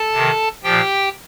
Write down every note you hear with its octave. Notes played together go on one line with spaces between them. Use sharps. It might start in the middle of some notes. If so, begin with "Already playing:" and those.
Already playing: A4 A5
C3 D#3
A#2 F3 G4 G5